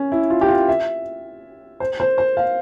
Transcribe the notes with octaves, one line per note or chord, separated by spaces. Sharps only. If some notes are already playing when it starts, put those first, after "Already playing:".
Already playing: C#4
E4
F4
G4
F4
E5
C5
C5
C5
F5